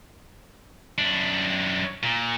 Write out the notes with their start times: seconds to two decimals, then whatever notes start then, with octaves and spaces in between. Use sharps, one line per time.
0.98 F#2 D4
2.03 A#2